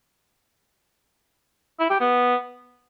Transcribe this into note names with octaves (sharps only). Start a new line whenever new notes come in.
E4
G4
B3